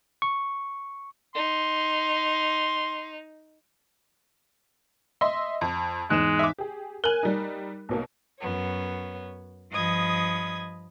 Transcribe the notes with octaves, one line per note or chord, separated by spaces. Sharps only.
C#6
D#4 C6
D#5 E5 C6
F2
E2 G#2 G#3 F#6 E7
E5 D6
G4 G#4
A#4 G#5 F#6 F#7
G3 D#4
B1 B2 A#3
F#2 B3 C#5
G2 F3 D#5 B5 D#6 G#6